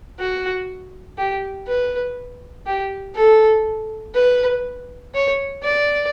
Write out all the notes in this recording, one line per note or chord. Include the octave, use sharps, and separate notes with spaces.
F#4
G4
B4
G4
A4
B4
C#5
D5